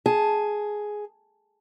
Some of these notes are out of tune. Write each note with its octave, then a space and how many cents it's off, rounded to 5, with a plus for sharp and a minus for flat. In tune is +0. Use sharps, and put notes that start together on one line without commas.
G#4 +5 A5 +0